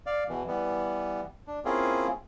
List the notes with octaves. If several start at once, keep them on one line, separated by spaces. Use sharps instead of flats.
D5 F5
E2 B2 E3
E3 G3 B3
D4
A#3 C4 C#4 E4 F4 G#4